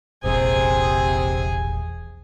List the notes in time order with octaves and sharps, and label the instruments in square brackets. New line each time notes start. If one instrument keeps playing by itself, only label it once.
[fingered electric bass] E1 A#1 E2 [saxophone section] C3 [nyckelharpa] G#4 G#5